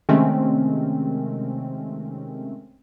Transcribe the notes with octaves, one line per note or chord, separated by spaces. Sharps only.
C3 D#3 G#3 A3 C4 C#4